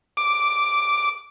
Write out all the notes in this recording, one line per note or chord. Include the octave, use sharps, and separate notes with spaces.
D6